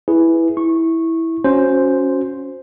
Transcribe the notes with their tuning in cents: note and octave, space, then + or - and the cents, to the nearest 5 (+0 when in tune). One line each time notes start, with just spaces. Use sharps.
E4 +0 G#4 +0 B4 +0
E4 -10 C#6 -15
C#4 +0 F#4 -20 C5 +0